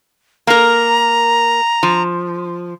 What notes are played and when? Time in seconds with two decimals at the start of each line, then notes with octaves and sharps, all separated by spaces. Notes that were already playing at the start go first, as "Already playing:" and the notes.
0.47 A#3 A#4 A#5
1.83 F3